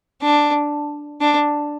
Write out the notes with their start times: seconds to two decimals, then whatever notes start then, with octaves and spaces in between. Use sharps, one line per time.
0.22 D4
1.21 D4